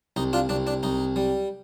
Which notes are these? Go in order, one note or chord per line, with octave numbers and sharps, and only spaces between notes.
C2 D#4
D4 F4
C2 D4
D4
C2 D#4
G3